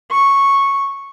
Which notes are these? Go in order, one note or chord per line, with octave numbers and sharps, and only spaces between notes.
C#6